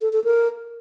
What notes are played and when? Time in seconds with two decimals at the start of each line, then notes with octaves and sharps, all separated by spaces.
0.01 A4
0.13 A4
0.24 A#4